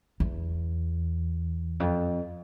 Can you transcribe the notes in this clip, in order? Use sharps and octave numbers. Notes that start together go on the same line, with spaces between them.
E2
F2